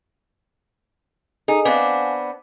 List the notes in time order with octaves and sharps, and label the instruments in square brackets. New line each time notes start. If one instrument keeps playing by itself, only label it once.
[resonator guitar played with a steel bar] D#4 [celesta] G#4 A4 G#5
[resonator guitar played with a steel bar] B3 C4 D4 [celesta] F5 F#5 G#5